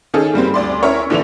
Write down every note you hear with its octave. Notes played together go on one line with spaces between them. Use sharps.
D#3 C#4 G#4 A4
G2 G3 A#3 C4
D2 D5 C6
C#4 E4 A#4 C#5
A#1 D3 E3 D4 F7